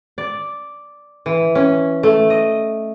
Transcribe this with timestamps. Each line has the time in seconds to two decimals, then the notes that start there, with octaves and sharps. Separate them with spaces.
0.18 D5
1.26 E3
1.55 C#4
2.03 A3
2.30 D#5